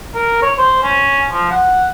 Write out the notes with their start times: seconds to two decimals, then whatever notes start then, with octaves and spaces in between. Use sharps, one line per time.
0.15 A#4
0.42 C#5
0.58 C5
0.83 C#4
1.31 F3
1.51 F#5